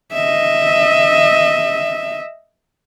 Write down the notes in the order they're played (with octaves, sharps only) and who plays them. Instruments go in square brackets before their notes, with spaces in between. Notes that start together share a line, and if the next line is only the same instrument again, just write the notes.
[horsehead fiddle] D#5 E5